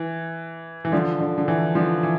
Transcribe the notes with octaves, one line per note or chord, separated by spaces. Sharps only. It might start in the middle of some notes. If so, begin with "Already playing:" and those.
Already playing: E3
E3
D3 F3
D3
D3
E3
D3 F3
E3